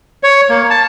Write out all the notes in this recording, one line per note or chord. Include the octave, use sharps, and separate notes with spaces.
C#5
A#3
A5